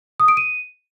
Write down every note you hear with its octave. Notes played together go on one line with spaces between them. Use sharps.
D#6
D7
D#7